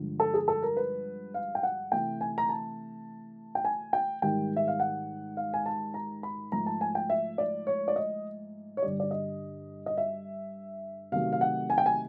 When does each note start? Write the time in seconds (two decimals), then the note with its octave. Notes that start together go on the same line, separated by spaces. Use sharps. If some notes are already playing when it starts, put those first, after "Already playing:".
Already playing: G2 D3 F3 G#3
0.20 A4
0.34 G#4
0.48 A4
0.63 A#4
0.77 B4
1.34 F5
1.55 G5
1.63 F#5
1.92 C3 E3 A3 G5
2.21 G#5
2.38 A#5
2.49 A5
3.55 G5
3.65 G#5
3.93 G5
4.22 G#2 D#3 G3 G5
4.56 E5
4.68 F5
4.80 F#5
5.37 F5
5.54 G#5
5.66 A5
5.94 A#5
6.23 B5
6.52 G#2 F3 A3 A#5
6.66 A5
6.81 G#5
6.95 G5
7.10 E5
7.38 D5
7.67 C#5
7.88 D5
7.96 D#5
8.77 C#5
8.82 G2 D3 G3 D5
9.00 D5
9.11 D#5
9.86 D#5
9.98 E5
11.12 C3 D#3 F#3 A3 F5
11.33 F5
11.41 F#5
11.70 G#5
11.78 G5
11.86 G#5